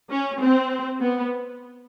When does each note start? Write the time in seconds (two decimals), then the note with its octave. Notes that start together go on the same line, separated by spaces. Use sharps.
0.10 C#4
0.40 C4
1.01 B3